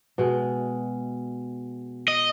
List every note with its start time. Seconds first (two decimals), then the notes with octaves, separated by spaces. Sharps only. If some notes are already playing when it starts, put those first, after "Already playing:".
0.18 B2 G#3
2.08 D#5